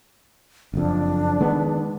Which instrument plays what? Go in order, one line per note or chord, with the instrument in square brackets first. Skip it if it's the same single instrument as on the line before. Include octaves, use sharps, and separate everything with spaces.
[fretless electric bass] F#1 F2 [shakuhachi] D4
[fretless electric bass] D#3 G#3 B3